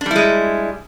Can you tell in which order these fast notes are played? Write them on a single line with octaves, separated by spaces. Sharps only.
D4 G3 E4 G#3